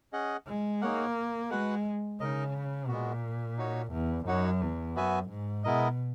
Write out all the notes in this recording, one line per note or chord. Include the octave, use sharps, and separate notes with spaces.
C#4 G#4 D#5 F#5
G#3
A#3 D#4 G#4 C#5 F#5
G#3 F#4 B4 F#5
C#3 D#4 A#4 D#5
A#2 G#3 B3 F#4
D#4 F#4 C#5
E2
F#2 D#4 F#4 C#5 F#5
E2
F#2 B3 F#4 B4 E5 G#5
G#2
B2 G#3 B3 E4 A#4 D#5